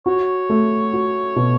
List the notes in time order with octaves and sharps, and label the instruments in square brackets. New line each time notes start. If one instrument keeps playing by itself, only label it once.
[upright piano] F#4 [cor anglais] C#5
[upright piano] A3
F#4
B2